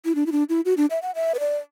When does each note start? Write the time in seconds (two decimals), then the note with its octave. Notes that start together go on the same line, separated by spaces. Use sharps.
0.05 E4
0.15 D4
0.26 E4
0.32 D4
0.49 E4
0.65 F#4
0.77 D4
0.90 E5
1.02 F#5
1.15 E5
1.34 B4
1.39 D5